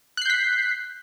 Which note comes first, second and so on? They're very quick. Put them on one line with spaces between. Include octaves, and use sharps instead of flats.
F#6 C7 G6 B6